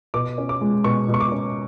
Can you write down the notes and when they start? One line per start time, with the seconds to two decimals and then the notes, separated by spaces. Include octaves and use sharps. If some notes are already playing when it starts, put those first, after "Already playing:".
0.14 B2 D6
0.38 C#4
0.49 D6
0.61 G#3
0.84 B2 C#6
1.08 B2
1.14 C#6
1.20 D6
1.32 C#4